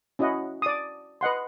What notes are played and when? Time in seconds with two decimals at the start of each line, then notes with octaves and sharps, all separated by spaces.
0.19 C#4 E4 F#4 D#5 F#5
0.62 D5 D#6
1.21 B4 D#5 F#5 C6